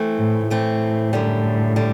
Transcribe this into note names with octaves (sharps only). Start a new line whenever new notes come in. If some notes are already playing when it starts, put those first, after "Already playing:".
Already playing: E3 A3 C4
A2
A2 E3 A3 C4
F#2 D3 G3
D3 G3